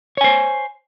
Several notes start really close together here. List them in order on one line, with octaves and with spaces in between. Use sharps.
C#5 G#5 C5